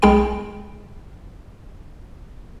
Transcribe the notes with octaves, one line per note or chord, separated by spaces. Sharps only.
B1 G#3 G#4 G5 B5 D7